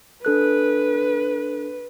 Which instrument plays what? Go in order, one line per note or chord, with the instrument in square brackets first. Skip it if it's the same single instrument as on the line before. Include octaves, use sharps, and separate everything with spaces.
[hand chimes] D4 A4 F#6 [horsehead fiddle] B4